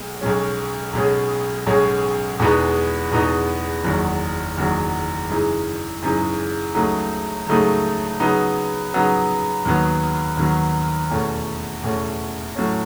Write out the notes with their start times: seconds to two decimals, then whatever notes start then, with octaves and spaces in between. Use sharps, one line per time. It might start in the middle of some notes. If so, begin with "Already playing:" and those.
Already playing: B1 B2 G#3
0.21 B1 B2 G#3 C#4
0.93 B1 B2 G#3 C#4 G#4
1.66 B1 B2 G#3 C#4 G#4
2.39 E2 B2 G#3 B3 D#4
3.11 E2 B2 G#3 B3 D#4
3.84 F#1 E2 D#3 F#3
4.57 F#1 E2 D#3 F#3
5.29 F#2 C#3 E3 G#3 D#4
6.02 F#2 C#3 E3 G#3 D#4
6.75 C#2 C#3 F#3 A3 D#4
7.47 C#2 C#3 F#3 A3 D#4
8.20 C#3 F#3 B3 D#4
8.93 C#3 F#3 B3 D#4
9.65 D#2 D#3 F#3 B3
10.37 D#2 D#3 F#3 B3
11.10 E2 B2 A3 C#4
11.83 E2 B2 A3 C#4
12.55 A2 F#3 A3 C#4